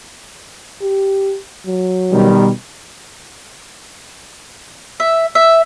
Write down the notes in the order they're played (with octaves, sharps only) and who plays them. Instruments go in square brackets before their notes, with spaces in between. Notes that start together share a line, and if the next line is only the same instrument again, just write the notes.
[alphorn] G4
F#3
[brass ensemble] B2 D#3 G3
[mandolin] E5
E5